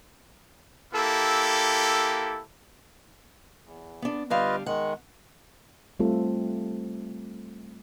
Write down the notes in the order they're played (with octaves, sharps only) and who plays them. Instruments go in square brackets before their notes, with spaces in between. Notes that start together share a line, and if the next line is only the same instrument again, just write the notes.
[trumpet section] A#3 E4 G4 A4
[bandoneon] E2
[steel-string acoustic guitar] B3 D4
[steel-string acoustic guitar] D3 G3 F5 [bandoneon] F4 B4 D#5
[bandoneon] D#3 G#3 [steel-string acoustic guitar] F#5
[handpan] G3 A3 C4 F4 A4